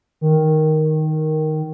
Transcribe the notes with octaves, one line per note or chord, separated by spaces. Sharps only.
D#3